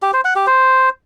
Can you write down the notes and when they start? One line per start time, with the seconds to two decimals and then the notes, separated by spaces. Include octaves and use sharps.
0.02 G4
0.13 C5
0.25 F#5
0.36 G4
0.47 C5